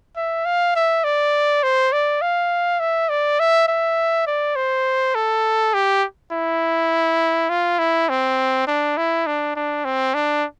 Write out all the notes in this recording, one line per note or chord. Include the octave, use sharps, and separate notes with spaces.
E5
F5
E5
D5
C5
D5
F5
E5
D5
E5
E5
D5
C5
A4
G4
E4
F4
E4
C4
D4
E4
D4
D4
C4
D4